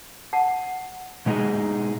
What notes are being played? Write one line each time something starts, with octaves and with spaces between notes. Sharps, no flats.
F#5 A5
B2 G#3 D#4 G#4